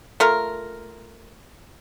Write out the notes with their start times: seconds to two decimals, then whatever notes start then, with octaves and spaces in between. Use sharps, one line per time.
0.20 A3 F4 A#4